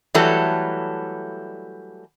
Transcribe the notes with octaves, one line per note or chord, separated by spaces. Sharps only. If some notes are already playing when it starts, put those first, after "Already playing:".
E3 F#3 G3 A3 A4